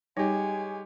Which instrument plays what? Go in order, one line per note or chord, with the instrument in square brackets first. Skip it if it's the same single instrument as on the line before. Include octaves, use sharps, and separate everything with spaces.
[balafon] G3 D#4 [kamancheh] G#3 G#5 [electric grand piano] G4 C#5